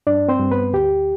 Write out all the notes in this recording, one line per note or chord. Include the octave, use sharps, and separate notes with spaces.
G2 D4 D5
C4 C5
G2
B3 B4
D2 G4